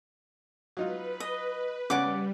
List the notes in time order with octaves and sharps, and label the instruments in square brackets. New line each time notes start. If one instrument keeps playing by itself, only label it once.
[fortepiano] F#3 D#4 F4 [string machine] B4
[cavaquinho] D#5
[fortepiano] C#3 C#4 [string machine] G3 [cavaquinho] D5 F#5 D6